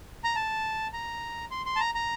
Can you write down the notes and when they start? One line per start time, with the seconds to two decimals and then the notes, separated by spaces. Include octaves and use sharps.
0.24 A#5
0.36 A5
0.93 A#5
1.51 C6
1.66 C6
1.76 A5
1.80 A#5
1.94 A#5